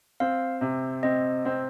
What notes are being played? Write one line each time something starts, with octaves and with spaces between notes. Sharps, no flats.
C4 F5
C3
C4 D#5
C4